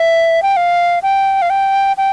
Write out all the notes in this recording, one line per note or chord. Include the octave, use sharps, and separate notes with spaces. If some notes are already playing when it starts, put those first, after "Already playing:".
Already playing: E5
G5
F5
G5
F5
G5
G5